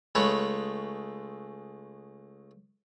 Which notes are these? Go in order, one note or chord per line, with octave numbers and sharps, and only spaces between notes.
C#2 G#3 A3 B4 C#5 B5